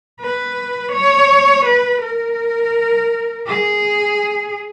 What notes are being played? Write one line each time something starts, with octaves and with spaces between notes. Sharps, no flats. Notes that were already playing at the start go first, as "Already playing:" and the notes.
B4
C#5
B4
A#4
G#4